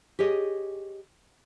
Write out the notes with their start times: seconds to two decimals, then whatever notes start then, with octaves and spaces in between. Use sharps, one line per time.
0.19 G4 G#4 C#5 D#5